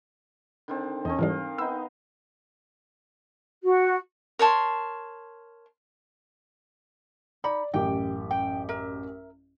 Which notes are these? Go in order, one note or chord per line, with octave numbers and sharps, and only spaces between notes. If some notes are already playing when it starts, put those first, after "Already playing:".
D3 D#3 C4
E2 C4 A4 D#5
G#2 E3 G3 A#4 F5
B3 D#4 E6
F#4
A#4 C#5 A5 C6
D#4 D5 B5
A1 F#2 G4 G5
G5
A#4 E5